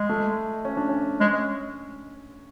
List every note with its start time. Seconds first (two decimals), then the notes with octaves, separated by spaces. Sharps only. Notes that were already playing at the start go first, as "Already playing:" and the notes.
Already playing: G#3
0.09 A3
0.65 C#4
0.77 D4
0.89 C#4
1.20 G#3 C#4